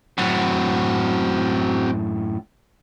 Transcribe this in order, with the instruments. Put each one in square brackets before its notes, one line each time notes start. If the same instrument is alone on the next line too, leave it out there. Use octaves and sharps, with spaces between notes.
[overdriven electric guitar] F#2 A2 [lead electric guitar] C4 F#4